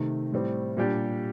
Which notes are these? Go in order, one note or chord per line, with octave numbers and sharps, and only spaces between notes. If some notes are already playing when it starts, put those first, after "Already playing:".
Already playing: C3 D#3 A3
A2 G3 C4
A#2 G3 D4 G4